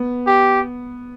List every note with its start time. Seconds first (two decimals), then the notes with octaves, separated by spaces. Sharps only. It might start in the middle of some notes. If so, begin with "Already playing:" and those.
Already playing: B3
0.27 G4